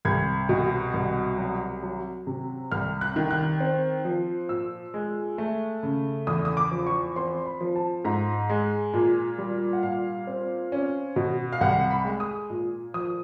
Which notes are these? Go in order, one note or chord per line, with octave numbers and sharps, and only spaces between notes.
C2 G#6
B2
C2
F#3
F#3
C3
C2 F6
F#6
D#3
F#6
C4
F3
A#2 E6
G#3
A3
C#3
E2 D#6
D#6
D6
F3
C#6
C4 C6
B5
F3
A5
G#2 A#5
G#3
A#2
G3
F#5
A#2 F5
C4
C#4
B2
F5
C2 F#5
B5
G#3
D#6
A#2
F3 D#6